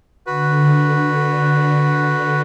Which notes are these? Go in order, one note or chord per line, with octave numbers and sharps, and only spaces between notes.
D3 F#4 B4